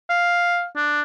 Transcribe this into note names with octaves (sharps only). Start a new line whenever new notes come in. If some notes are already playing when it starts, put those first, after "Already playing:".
F5
D4